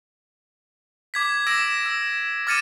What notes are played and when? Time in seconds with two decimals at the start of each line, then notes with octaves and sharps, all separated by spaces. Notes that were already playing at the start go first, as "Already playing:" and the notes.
1.14 D6 G#6 B6
1.47 D6 E6 A#6 D7 E7
1.86 E6
2.47 D6 F6 A6 C#7 D#7 E7